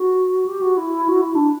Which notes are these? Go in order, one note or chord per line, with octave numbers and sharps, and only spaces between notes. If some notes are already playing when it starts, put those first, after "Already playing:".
Already playing: F#4
G4
F#4
E4
F#4
E4
D4